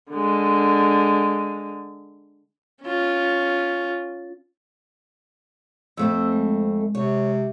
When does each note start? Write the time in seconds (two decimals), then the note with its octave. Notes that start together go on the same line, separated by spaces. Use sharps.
0.10 D3 G#3
2.82 C#4 F4
5.97 F2 A3 C4 E6
6.32 G#3
6.95 C3 C#5